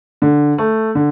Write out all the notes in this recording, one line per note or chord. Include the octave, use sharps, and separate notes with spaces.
D3
A3
D3